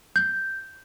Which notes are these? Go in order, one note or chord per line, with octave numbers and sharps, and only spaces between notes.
G6